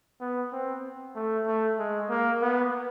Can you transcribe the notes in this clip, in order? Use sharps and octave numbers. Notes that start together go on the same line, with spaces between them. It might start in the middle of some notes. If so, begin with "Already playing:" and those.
B3
C4
A3
A3
G#3
A#3
B3